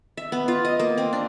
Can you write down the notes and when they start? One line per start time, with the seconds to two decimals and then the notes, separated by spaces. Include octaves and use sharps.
0.17 E5
0.32 B3
0.48 F4
0.65 D#5
0.80 A#3
0.98 C4
1.13 D4